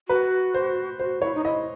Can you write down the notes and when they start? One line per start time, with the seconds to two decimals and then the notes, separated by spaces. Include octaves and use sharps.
0.08 F#4 B4
0.54 C5
0.99 F#4 C5
1.22 E4 C#5
1.35 D#4
1.45 E4 D#5